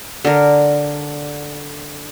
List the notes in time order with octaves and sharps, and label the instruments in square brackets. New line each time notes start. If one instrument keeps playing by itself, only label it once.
[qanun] D3 A#4